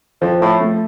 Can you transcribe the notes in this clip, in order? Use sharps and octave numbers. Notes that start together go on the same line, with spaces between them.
F2 F3
A2
A3